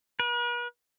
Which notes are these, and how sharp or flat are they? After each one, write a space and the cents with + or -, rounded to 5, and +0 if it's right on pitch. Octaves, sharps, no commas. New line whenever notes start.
B4 -45